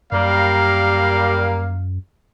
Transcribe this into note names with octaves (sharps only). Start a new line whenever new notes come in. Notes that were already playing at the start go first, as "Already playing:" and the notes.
F#2 G3 A#3 A#4 F5